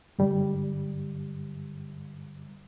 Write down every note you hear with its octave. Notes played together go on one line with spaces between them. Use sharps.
G2 D3 G3